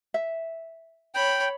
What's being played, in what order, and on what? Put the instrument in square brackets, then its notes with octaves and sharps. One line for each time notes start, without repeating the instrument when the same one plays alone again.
[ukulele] E5
[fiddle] C#5 B5 [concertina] G5